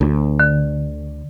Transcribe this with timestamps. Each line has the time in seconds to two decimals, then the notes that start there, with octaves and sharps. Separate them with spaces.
0.01 D2
0.40 D3